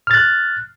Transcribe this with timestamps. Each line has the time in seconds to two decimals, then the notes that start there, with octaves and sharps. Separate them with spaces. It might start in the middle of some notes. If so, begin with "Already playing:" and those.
0.07 F6
0.11 A6
0.14 F#6